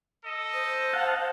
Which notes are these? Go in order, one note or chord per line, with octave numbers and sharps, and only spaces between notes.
A4 D#5
C5
F5 F#5 A5